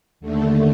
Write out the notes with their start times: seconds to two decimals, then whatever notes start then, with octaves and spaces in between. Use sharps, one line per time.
0.21 D#2 D3 A3